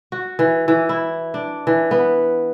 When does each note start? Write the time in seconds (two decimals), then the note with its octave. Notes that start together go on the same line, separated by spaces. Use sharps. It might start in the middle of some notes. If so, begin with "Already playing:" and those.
0.12 F#4
0.39 E3
0.68 E3
0.89 E4
1.34 D4
1.67 E3
1.91 B3